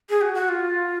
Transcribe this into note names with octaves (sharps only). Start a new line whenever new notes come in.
G#4
F#4
F#4
F4